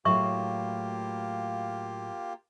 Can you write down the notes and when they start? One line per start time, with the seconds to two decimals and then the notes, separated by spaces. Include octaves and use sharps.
0.05 A2 F#3 A#3 F4 G4 E5 C#6